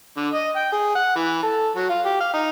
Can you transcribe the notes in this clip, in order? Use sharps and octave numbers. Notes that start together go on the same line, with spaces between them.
D3
D#5
G5
G#4
F#5
E3
A4
F#3
F4
G4
F5
D#4